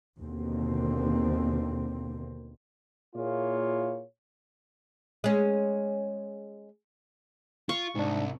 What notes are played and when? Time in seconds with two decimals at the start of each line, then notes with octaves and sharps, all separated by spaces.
0.22 D#2 B2 D3 A#3 C4
3.16 A#2 A#3 E4 F4 G#4 C#5
5.24 G#3 C#4
7.69 F4 C#6
7.95 C2 G#2 D4